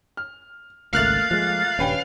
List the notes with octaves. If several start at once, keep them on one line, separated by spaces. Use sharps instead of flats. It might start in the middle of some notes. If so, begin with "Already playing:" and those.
F6
G#1 C#2 A3 A#3 F5 F6 F#6 A6
F3 G#3
D#1 G2 C#4 B4 G5